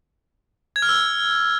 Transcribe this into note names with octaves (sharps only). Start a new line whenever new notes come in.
G#6
F6
E6